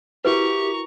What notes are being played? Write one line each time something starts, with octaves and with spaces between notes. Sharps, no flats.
E4 F#4 G4 A#4 B4 A#5 C#6